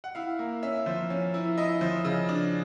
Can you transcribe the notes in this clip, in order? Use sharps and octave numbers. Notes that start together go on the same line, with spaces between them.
F#5
E4 F5
A#3
C#4 E5
F3
C#4
E4
E4 D#5
F3
C#3
D4